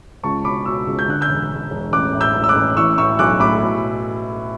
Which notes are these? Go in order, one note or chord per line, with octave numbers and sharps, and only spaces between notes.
C#2 A5 C#6
B2 B5 D6
B2 C#6 E6
C#2
G6
D3 F#6
E6 G6
E1
E1
E1
A1 D6 F#6
A2
E6 G6
A1
E6
D6 F#6
A1
E3 C#6 E6
A2 C#6 E6
B1 D6 F#6
A2 B5 D6
B2